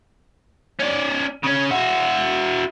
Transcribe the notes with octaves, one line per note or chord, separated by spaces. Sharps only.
C#4 D5
C#3 C#4
E4 F#4